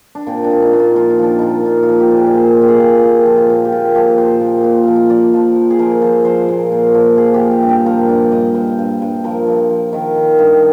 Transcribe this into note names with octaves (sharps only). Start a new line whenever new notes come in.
D4
A#2 C4
D4
A#2
D#4
A#2
F4
F3 F4
D#4
F3 D4
A#2 D#4
A#2 F4
F4
F3
G4
A#2
G#4
D5
A#2 C5
A#2 G4
G#4
A#2
A#2 G4
F3
F4
A#2
G4
A#2 F4
F3 G4
A#2 C5
A#2
A#2
F3 F5
D#5
F3 D5
F3
F3
G#4
F3 A#4
F3 C5
F3 C5
A#2
A#2
F3
F3 G#4
G4
F3
G4
G2
G4
F3 A#4
G2 D5
G2 D#5
G2 C5
G2
G2
F3 A#4
F3
F3
D#3 A#4
D#3
G2